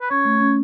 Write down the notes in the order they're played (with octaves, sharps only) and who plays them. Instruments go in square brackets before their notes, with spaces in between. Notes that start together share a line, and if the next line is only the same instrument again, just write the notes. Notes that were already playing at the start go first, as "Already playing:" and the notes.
[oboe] B4
[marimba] C#4 [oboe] C#5
[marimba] A3
C#4